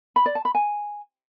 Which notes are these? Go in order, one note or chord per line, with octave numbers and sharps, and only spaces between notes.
B5
D5
A5
B5
G#5